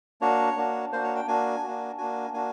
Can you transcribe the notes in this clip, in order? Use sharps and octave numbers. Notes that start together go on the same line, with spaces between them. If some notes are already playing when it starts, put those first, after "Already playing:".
A#3 D4 F#4 C#5
A#3 D4 F#4
A#3 D4 F#4 C5
C#5
G5
A#3 D4 F#4 G#5
A#3 D4 F#4
A#3 D4 F#4 G#5
A#3 D4 F#4 G#5